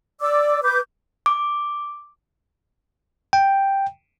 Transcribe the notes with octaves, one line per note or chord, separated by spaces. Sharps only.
D5 D6 E6
B4 D6 G6
D6
G5